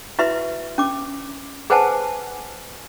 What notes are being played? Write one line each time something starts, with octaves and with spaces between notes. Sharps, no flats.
E4 F#4 B4 E5 C6
C#4 D6
G#4 B4 C5 F#5 G#5 A5